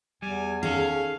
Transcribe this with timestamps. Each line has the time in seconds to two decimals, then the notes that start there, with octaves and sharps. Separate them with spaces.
0.22 E2 G3 G#5
0.63 D#3 C#4 G#4 A4 F5